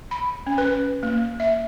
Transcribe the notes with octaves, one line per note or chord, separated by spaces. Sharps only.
B5
C#4
B4
A#3
E5